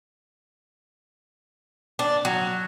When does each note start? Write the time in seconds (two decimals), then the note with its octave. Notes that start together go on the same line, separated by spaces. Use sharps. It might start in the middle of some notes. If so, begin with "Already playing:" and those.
1.99 D4
2.25 F#3